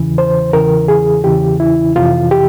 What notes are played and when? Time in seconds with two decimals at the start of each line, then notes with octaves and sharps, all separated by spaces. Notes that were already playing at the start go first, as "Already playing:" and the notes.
Already playing: E2 C#3 E3
0.18 C5
0.53 E2 C#3 E3 A#4
0.88 G#4
1.24 E2 C#3 E3 G4
1.60 E4
1.96 F2 C3 E3 F4
2.31 G4